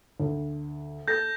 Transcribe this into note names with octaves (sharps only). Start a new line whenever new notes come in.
D2
A4 G6 A6 A#6